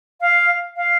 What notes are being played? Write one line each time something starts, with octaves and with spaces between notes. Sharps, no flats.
F5
F5